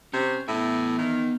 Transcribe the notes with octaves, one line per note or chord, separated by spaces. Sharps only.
C3 C#4
A2 B3 E5
D#3